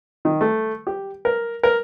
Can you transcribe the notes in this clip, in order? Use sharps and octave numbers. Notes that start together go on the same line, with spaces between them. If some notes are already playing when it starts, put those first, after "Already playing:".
D#3
A3
G4
A#4
A#4